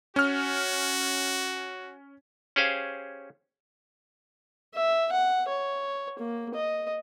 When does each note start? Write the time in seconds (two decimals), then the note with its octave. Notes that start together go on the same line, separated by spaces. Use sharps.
0.16 C#4 F#4 F6
2.56 C#4 G4 G#4 C5 F5
4.75 E5
5.12 F#5
5.48 C#5
6.19 A#3
6.54 D#5